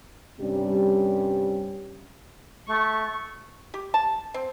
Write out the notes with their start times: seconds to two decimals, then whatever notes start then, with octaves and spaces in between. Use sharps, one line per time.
0.39 G2 C3 G3 C#4 G4
2.67 A3 C#6
3.74 G4
3.94 A5
4.34 C4